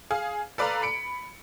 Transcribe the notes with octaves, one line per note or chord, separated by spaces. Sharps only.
G#4 F5
A4 B4 D5 F5 A#5
B5 C#7 D7